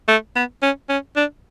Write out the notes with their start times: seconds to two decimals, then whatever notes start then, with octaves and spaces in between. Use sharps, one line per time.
0.08 A3
0.36 B3
0.62 C#4
0.90 C#4
1.16 D4